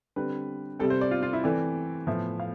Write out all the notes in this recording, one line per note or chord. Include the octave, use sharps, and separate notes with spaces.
D3 G3 C4 B4
C3 G3 C4 A4
C5
D5
F4
F4
E4
E3 A3 C4 D5
A2 F3 B3 E5
F5